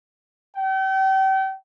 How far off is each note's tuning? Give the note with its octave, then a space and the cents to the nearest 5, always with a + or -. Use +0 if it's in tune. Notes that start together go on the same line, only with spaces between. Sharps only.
G5 -35